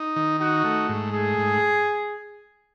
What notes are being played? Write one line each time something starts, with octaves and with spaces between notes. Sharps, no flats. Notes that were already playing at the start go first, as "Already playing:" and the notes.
Already playing: D#4
D#3
D#4 F#4
A3
G#2
A3 G#4
G#2